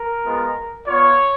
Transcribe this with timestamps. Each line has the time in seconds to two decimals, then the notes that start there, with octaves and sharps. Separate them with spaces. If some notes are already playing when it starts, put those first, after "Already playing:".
Already playing: A#4
0.24 G#3 B3 F4
0.87 B3 F4 C#5